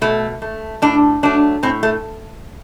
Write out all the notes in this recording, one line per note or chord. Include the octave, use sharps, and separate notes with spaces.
B2 A3
A3
A2 D4
F#3 A3 D4
A2 C4
A3